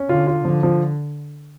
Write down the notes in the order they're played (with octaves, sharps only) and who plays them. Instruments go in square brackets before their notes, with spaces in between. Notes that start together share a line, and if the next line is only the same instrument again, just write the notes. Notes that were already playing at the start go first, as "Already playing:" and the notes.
Already playing: [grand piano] C#4
[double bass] D3 [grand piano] F4
[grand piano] F4
[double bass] D3 [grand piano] F3
[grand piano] F3